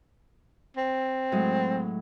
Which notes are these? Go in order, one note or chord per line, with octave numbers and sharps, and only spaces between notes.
C4
A2 F#3 G#3